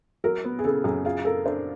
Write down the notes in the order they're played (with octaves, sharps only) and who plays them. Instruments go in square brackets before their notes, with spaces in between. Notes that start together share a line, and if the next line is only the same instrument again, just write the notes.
[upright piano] F#3 [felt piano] A#4
[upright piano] B3
[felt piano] G#4
[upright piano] C#3 [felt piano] A4
[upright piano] F#2 [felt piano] G#4
[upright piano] F4 [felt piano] G#4
[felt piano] A4 [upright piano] A#4
[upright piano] D4 [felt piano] C5